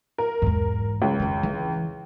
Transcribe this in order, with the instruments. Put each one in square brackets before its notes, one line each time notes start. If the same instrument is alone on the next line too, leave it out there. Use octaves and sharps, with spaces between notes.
[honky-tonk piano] A#4
[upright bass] E2 G#2
[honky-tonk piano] C#2
[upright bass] F2 D#3
E3